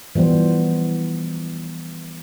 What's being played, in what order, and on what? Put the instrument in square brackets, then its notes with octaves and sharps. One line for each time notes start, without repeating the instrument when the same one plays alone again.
[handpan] E3 F3 G3 B3 C5